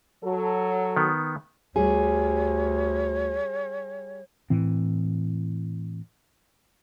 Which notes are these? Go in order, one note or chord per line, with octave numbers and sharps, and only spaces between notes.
F#3 A4
D#3 B3
D2 G3 G#4 C#5
A2 E3 C4